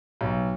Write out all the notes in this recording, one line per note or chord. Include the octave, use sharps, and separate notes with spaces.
B1